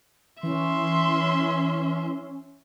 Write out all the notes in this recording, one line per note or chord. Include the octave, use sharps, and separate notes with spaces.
E3 C#4 E5 C6